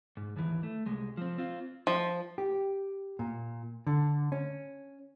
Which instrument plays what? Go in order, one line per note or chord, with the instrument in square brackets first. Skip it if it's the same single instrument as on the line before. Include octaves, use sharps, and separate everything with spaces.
[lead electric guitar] G#2
D#2 E3
A3
C2 G#3
F3 C4
C4 F4
[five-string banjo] F3
[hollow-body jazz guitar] G4
A#2
D3
C#4